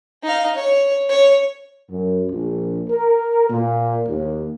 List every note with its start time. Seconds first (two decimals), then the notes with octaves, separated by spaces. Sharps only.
0.23 D#4 F5
0.55 C#5
1.09 C#5
1.90 F#2
2.30 A#1
2.90 A#4
3.49 A#2
4.08 D#2